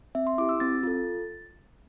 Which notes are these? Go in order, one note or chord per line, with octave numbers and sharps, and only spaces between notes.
C4 E5
C6
E4 G4 D6
E6
C4 A6
F4 A4